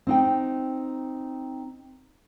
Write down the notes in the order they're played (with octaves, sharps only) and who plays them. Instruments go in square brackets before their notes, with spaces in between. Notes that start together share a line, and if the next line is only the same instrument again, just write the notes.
[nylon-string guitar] C4 D#4 G5